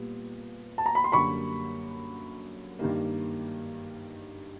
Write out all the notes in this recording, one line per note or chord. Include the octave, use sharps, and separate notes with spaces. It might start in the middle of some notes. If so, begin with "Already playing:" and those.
Already playing: A#2 G3 B3
A5
A#5
B5
C6
F#2 D3 G3 A#3 B5 C#6
G2 D#3 G3 A#3